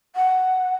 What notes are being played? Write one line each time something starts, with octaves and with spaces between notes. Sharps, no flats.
F#5